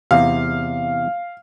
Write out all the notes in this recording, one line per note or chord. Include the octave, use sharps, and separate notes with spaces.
E2 C3 F5